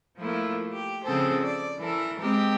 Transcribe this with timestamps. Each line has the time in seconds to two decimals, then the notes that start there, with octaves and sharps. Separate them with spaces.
0.18 F3 A3 A#3 E4 F4
0.72 G4
1.05 C#3 F3 C4 G#4 A4 C5
1.42 D5
1.79 E3 A4 A#4
2.21 G#3 C4 G4 A#4